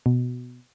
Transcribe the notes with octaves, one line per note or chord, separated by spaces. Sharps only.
B2